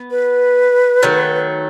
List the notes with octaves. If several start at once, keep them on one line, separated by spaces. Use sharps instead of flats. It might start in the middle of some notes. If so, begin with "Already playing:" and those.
Already playing: B3
B4
D#3 F#3 A3